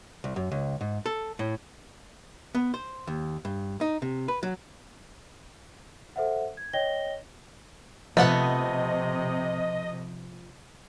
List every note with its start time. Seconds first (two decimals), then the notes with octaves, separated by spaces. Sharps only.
0.24 C2
0.36 F#2
0.52 C#2
0.81 G#2
1.06 A4
1.39 A2
2.55 B3
2.74 C5
3.07 D#2
3.45 G2
3.81 D#4
4.02 C3
4.28 B4
4.43 F#3
6.16 A4 C5 E5 F#5
6.57 G#6
6.73 C#5 D#5 G5 A#6 G7
8.17 C3 F3 A3 B3 D#5 F#5